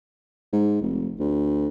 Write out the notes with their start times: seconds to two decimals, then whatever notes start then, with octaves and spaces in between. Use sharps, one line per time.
0.52 G#2
0.82 F1
1.19 D2